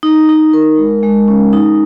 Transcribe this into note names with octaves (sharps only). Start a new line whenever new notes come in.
D#4
D#4
A#4
G#3
G#3
C#4
D#4